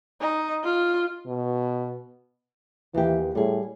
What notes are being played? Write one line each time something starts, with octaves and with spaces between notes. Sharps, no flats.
D#4
F4
B2
D#2 E3 G4
A2 G3 G#4